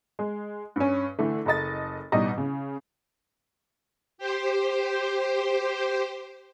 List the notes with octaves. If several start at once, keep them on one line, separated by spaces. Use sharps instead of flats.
G#3
G2 C#4
D3 E3 A3
F#1 A4 D#5 A6
A1 B2 G3 D#4 D#5
C#3
G4 C5